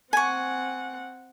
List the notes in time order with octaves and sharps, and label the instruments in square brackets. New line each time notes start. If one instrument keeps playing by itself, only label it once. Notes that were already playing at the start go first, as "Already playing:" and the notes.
[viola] C4 F#5 [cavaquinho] G#5 C#6